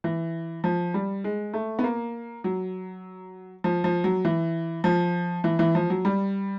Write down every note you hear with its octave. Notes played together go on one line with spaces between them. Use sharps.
E3
F3
G3
G#3
A3
B3
A#3
F#3
F3
F3
F#3
E3
F3
E3
E3
F3
F#3
G3